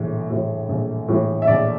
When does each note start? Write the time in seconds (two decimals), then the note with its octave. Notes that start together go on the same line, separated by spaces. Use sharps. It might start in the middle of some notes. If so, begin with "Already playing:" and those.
Already playing: A#1 A2 E3
0.30 A2 E3
0.69 A#1
1.08 A2 E3
1.42 E5
1.47 A#1 D5